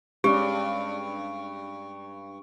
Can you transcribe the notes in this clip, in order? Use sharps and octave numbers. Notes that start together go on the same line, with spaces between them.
G2 G#3 C#4 G4 D5 C#6 D7